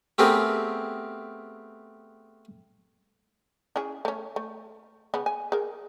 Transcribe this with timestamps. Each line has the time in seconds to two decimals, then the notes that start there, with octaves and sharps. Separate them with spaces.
0.18 A3 B3 C4 G4 G#4 A#4
3.76 C#4 E4 G#4
4.05 A3 C#4
4.36 A3
5.14 C#3 B3 B5
5.26 G#5
5.52 G#4 A#4